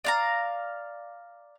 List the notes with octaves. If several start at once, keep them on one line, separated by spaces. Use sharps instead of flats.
D5 F5 A#5